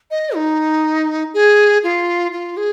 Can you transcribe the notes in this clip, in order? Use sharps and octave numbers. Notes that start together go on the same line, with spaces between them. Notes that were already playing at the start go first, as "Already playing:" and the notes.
D#5
D#4
G#4
F4
F4
G#4